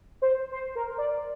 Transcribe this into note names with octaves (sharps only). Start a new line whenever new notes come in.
C5
C5
A#4
D5